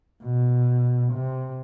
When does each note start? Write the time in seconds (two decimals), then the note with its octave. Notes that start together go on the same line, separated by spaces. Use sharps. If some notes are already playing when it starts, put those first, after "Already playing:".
0.23 B2
1.12 C3